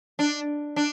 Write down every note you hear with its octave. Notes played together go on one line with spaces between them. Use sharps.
D4
D4